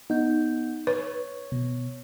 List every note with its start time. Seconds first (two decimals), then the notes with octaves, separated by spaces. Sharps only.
0.10 B3 D#4 G6
0.87 B4 C#5
1.52 B2